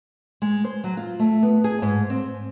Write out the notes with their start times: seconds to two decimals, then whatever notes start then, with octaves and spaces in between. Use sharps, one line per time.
0.42 G#3
0.64 C5
0.84 F#3
0.97 F4
1.19 A3
1.43 B3
1.64 G#4
1.82 G#2
2.10 C4